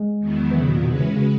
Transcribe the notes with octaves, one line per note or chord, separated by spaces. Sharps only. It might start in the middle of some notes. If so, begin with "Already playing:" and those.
Already playing: G#3
E2 D#3 F#3 B3 E4
E3
C#3
B2
A#2
B2 G#3 C#4 F#4 B4
C#3
E3
C#3